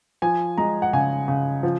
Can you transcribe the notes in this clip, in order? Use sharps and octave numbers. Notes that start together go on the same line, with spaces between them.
F3 G#5
G#3 A#5
F#5
C#3 G#5
C#3
F3